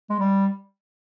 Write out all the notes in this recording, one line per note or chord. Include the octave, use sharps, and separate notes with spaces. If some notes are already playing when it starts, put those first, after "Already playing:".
G#3
G3